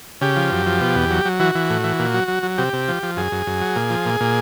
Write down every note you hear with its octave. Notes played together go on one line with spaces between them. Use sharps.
C#3 G4
F3
F#2
F3
B2
E2
F#3
F#3
E3 F#4
E3
A2
E3
A#2
F#3
F#3
F#3
C3 G4
C3
F3
F3
F#2 G#4
F#2
F#2
F#3
A#2
F3
A#2
A#2